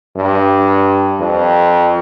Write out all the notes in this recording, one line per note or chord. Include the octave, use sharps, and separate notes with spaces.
G2
F2